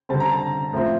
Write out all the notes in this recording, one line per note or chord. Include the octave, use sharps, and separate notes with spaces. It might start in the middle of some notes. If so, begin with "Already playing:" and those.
D3 G3 C4 A5
A#5
A5
A2 F3 C4